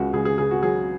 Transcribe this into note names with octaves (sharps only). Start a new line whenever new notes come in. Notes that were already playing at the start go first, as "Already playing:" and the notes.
Already playing: C#2 C#3 F#4
C#2 G#4
G#4
C#3 G#4
F#4
F#3 G#4